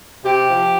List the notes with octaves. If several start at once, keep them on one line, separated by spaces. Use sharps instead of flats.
C3 G4
F3